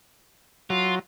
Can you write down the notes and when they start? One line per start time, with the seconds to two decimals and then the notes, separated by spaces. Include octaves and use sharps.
0.70 F#3 F4